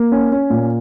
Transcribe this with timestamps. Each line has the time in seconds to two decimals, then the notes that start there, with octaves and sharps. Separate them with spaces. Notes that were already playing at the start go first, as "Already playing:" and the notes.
Already playing: A#3
0.12 C#4
0.32 C#4
0.50 A#2